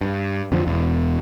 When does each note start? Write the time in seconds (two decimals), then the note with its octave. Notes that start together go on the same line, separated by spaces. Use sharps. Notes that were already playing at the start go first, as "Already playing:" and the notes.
0.01 G2
0.52 F2 D3 F3
0.67 E1 E2